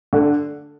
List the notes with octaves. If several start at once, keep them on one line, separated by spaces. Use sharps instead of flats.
D3